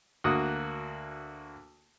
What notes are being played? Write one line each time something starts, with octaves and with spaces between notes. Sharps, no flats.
D2 A#3 F#4 D#6 F#6